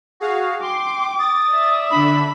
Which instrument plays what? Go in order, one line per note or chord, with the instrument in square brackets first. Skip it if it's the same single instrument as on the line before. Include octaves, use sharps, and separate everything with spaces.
[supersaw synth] F#4 G#4 F5
[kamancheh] G5 [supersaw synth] C6 [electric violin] D6
[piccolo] D#6 [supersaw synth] A6
[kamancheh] D5 E5
[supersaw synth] D3 D4 [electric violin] B5